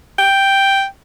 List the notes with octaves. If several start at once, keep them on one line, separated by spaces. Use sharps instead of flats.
G5